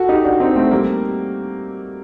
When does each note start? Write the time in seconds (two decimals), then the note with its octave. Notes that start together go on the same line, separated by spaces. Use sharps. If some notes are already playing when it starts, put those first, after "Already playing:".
Already playing: F#4 A4
0.09 D#4 G4
0.24 D4 F#4
0.40 C4 D#4
0.56 A3 C4
0.71 G3 A#3